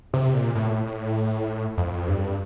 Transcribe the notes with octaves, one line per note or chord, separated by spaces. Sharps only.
C3
A#2
A2
F2
G2